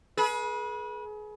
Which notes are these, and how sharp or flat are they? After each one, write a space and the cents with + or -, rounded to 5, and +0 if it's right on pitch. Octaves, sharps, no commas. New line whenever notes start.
G#4 +30 B4 -30